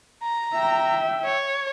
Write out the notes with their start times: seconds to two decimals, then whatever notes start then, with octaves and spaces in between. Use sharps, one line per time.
0.23 A#5
0.54 E5 G5
1.25 C#5